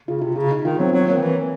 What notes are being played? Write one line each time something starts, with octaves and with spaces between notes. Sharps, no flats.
C#3 F4
C3 F4
C#3 F4
D#4
D#3 F4
F#3 C4
F#3 C4
F#3 A#3
D#3
E3